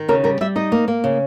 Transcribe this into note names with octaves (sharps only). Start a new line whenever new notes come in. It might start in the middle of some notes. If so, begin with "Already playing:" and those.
Already playing: D#3
C#3 A#4
G3 A#4
G3 E5
D#4 D#5
A#3
A#3
C#3